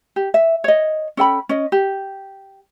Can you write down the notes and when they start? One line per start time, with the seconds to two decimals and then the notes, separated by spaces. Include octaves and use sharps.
0.16 G4
0.34 E5
0.64 C#5 D#5
1.17 C#4 A4 G5 B5
1.49 C#4 D#5
1.72 G4